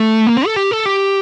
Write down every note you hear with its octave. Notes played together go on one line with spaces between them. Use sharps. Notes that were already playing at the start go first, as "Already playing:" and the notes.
Already playing: A3
A#3
C4
A4
G4
A4
G4